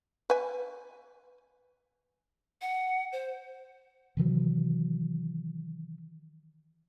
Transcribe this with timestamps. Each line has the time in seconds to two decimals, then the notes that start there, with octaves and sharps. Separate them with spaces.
0.30 B4 G#5
2.61 F#5
3.12 C5
4.17 C3 D#3 E3 F#3